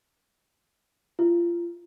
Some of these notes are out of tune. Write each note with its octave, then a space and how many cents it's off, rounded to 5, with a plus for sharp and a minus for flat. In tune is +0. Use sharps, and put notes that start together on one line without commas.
F4 -25